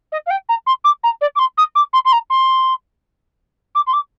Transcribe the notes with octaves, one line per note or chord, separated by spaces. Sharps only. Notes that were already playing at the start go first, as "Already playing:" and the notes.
D#5
F5
G5
A#5
C6
D6
A#5
D5
D6
C6
D#6
D6
C6
C6
A#5
C6
D6
C6
D6